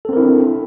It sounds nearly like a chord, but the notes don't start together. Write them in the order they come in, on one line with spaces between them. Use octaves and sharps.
A4 C4 A#4 E4 D4